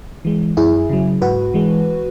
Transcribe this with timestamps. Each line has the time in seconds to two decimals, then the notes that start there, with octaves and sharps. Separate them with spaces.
0.25 E3 G#3
0.57 F#2 E4 G#4
0.89 C#3 F#3
1.21 G#2 F#4 B4
1.54 E3 G#3